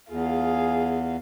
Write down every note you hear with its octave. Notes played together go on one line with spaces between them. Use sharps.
E2 F4 G#4 F5